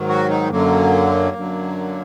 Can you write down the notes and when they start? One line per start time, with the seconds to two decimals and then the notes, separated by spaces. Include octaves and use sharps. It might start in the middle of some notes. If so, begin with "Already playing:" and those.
Already playing: G#2 D#3 F#3
0.08 F#4
0.29 D#4
0.51 F#2 D3 F#3 A#3
1.36 F#2 D3 F#3